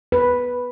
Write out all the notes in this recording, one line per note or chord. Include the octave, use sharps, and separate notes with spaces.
B4